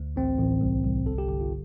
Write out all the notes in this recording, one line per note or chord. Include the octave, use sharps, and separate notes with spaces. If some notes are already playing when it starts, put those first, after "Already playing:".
Already playing: D2
A1 C4
A1
C2
C2
G1 A4
G4
G1 G4
F4